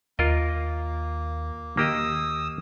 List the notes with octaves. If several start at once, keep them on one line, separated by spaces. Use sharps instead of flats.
D#2 A#3 F4 A#4 D#5
D#2 A#3 G4 D#5 D#6 E6